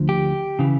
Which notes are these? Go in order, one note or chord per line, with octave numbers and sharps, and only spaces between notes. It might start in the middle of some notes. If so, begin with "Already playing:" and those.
Already playing: D2 D3 F3
G4
C#3 E3